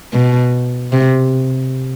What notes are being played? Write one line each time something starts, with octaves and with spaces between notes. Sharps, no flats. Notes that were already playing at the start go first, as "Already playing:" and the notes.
B2
C3